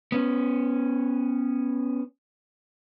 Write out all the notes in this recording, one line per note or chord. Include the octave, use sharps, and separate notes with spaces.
B3 C#4